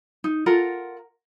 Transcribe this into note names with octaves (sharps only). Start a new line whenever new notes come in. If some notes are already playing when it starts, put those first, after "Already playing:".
D#4
F4 A4 A#4 F#5